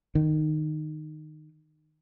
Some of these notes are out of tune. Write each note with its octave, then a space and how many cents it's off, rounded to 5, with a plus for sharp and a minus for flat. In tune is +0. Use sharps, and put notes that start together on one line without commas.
D#3 -15